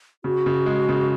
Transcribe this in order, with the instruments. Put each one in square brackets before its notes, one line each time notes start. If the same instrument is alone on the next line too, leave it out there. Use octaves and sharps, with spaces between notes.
[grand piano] C#3 [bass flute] F#4
[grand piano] C#3
G#3
C#3